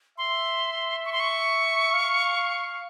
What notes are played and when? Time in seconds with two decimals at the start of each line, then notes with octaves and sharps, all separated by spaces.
0.18 E5 C6
1.05 C#6
1.13 C6
1.20 C#6
1.93 F5